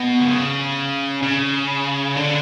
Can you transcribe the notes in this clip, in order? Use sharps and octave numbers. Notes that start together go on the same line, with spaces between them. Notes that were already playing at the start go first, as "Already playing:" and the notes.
Already playing: B2
D3
C#3
C#3
D3